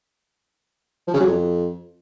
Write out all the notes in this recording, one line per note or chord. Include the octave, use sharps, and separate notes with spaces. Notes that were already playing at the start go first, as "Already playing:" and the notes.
F3
C#3
F#3
F2